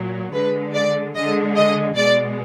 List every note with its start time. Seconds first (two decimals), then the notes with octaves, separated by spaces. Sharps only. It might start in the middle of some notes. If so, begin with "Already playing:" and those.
Already playing: A#2 F#3
0.34 D3 G#3 B4
0.75 D5
1.15 D3 G#3 D#5
1.56 D#5
1.96 B2 G#3 D5